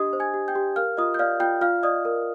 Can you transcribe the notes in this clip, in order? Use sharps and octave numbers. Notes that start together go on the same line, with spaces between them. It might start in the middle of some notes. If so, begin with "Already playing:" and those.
Already playing: D4 G4 D#5 D#6
C5
G#5 G#6
G4
G5 G6
G4
A#4 F5 F6
F4 D#5 D#6
G6
D5 F5 F6
F4 G5 G6
F4 F5 F6
D5 D#5 D#6
A#4